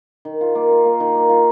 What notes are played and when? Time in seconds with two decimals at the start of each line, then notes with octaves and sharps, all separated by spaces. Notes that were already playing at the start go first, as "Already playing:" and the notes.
0.25 D#3
0.41 F4
0.55 A#3
0.71 F4
0.85 A#3
1.00 D#3
1.15 A#3
1.30 F4